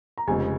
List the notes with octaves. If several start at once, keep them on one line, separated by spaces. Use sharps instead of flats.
A#5
F1 F2 C#3 F3 G#3 G#5